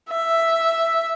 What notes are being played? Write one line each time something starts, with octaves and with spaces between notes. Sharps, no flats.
E5